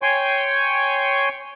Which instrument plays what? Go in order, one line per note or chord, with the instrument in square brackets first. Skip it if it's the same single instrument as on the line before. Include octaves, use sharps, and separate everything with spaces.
[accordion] C#5 G5 G#5 C6 C#6